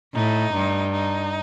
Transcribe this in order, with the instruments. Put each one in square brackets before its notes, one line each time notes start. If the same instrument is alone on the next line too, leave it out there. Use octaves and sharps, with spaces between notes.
[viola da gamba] A2 [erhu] D#4
[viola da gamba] G2
[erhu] D#4